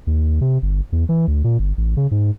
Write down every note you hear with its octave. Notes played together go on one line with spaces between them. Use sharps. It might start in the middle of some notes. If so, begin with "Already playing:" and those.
D#2
C3
G1
E2
E3
D2
A#2
G1
A1
C#3
G#2